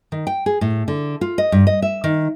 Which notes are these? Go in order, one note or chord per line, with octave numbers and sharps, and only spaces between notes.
D#3
G5
G#4
A2
D3
F4
D#5
G2
D#5
E5
D#3